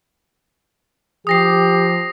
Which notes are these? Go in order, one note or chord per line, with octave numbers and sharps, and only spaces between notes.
F3 G4 D#6 A#6 C7